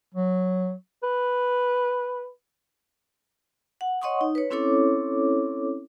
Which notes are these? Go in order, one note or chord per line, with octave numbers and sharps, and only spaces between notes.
F#3
B4
F#5
C#5 D#5 F#5 C6 C#6 D#6
D#4
B4 C#5
C4 C#4 E4 A4 C#5 D6